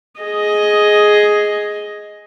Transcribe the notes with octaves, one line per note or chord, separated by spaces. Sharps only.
G#4 D#5